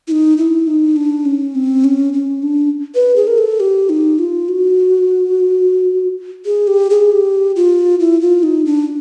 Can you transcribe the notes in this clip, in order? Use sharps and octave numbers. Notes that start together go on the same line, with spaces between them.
E4
D#4
E4
D#4
D4
C#4
C4
C#4
C#4
D4
B4
G#4
A#4
A4
G4
D#4
F4
F#4
G#4
G4
G#4
G4
F4
E4
F4
D#4
D4